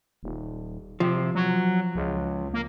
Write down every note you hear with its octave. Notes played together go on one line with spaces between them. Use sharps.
D#1
C3 F3
F#3
C#2
A#3